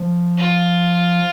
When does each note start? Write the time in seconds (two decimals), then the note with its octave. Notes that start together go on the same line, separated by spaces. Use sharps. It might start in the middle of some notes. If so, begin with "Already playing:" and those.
Already playing: F3
0.37 F4